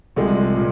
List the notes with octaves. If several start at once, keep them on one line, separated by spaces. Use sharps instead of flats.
C2 C3 F3 G#3
A#2